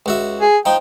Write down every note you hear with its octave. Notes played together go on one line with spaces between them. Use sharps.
C#2 F#4 E5
G#4
F3 D#4 G5